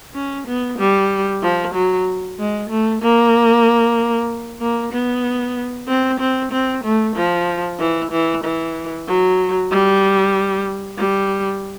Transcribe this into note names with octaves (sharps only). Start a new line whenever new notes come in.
C#4
B3
G3
F3
F#3
G#3
A3
A#3
A#3
B3
C4
C4
C4
A3
F3
E3
E3
E3
F#3
G3
G3